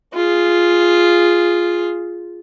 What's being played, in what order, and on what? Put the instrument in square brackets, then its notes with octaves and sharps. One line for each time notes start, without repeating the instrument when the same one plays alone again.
[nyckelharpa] F4 G#4